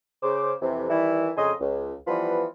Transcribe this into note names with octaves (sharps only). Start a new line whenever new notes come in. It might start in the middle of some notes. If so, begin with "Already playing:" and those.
C#3 C5 D6
F2 C3 E3
D#3 E3 G3 E4
F2 C#3 D#5 G#5 C6 D#6
C#2
E3 F3 G3 B3 F4 B4